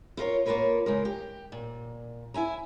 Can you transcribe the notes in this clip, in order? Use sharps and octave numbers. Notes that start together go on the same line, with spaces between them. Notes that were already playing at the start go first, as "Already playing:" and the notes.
E4 F4 A#4 C#5
A#3 F4 F#4 A#4 B4 C#5
C#3 G#3 A#4
G4
A#2
E4 E5 G#5 A#5